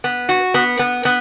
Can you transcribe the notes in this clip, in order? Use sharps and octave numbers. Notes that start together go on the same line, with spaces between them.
B3
F#4
B3
B3
B3